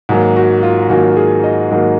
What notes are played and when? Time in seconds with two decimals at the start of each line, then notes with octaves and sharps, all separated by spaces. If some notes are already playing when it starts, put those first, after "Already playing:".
0.09 G#2 D#3 F#3 A#3
0.36 F#4
0.63 F4
0.90 G#2 D#3 F#3 A#3 F#4
1.17 G#4
1.44 D#5
1.71 G#2 D#3 F#3 A#3